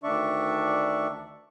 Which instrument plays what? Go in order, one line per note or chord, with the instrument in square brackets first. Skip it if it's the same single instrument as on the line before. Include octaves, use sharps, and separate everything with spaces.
[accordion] D2 D#3 D4 D5 E5 C#6